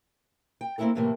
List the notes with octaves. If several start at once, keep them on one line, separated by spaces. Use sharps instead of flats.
G5
A#3 C4 D4 E4 A4 A#4
A2 C3 E3 A3 A#3